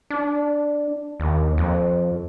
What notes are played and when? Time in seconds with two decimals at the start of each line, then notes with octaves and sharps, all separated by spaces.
0.10 D4
1.20 D#2
1.58 F2